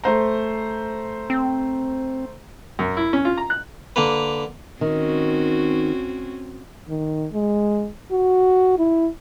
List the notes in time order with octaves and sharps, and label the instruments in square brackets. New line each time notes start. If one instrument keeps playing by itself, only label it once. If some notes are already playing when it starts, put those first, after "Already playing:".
[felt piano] A3 C5 A#5
[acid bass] C4
[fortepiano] F#2
E4
C#4
F4
A#5
F#6
[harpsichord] D3 A#3 B4
[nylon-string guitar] D#3 [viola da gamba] C4 C#4 F#4
[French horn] D#3
G#3
F#4
E4